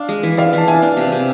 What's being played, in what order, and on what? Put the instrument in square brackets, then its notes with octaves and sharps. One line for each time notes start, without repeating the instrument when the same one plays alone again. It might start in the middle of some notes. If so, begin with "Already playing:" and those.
Already playing: [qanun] D4 [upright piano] F5
[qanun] G#3
E3
[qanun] G#3 [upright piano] D5 F5
[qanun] E3 [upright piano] A5
[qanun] D4 [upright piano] E5 G#5
[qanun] D4
C3
C3